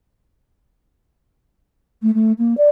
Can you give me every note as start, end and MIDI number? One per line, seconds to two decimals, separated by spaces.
2.02 2.13 57
2.14 2.32 57
2.38 2.54 58
2.57 2.69 74